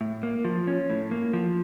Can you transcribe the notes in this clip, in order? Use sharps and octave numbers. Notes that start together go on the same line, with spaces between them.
A2
A#3
F3
C#4
A2
A#3
F3